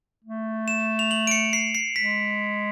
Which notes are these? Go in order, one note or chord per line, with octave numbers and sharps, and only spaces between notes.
A3
E7
F7
F#7
D7
C#7
C7
C7
G#3 B6